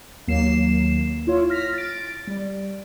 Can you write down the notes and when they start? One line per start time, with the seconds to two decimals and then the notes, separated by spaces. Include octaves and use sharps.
0.27 D#2 F#3 A#3 C7 E7
1.27 E4 F4 C#5
1.50 F6 A#6 B6
1.74 A6 D7
2.27 G3